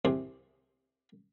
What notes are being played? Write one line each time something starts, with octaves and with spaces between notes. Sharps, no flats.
C2 C3 G4 G#4 C6